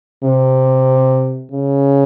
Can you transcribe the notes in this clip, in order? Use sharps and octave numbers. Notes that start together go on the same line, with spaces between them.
C3
C#3